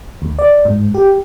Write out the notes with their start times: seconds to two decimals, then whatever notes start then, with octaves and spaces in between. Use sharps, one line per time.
0.22 D2
0.39 D5
0.65 G#2
0.94 G4